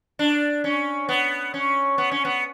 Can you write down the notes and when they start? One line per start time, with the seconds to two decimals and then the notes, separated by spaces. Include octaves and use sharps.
0.19 D4
0.64 C#4
1.09 B3
1.54 C#4
1.98 B3
2.11 C#4
2.25 B3